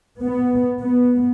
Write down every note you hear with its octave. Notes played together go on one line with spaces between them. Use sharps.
B3
B3